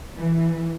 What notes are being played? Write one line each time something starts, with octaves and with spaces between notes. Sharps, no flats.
E3